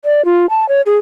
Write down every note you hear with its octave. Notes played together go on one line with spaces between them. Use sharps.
D5
F4
A5
C#5
G#4